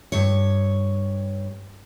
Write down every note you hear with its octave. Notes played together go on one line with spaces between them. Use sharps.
G2 C#5